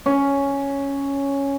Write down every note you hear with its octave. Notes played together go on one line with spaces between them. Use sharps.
C#4